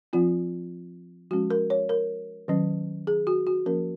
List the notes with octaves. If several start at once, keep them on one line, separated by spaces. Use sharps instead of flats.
F3 C4 F4
F3 G#3 C#4 F#4
A#4
C#5
A#4
D#3 F#3 C#4
G#4
F#4
F#4
F3 A#3 C#4 A#4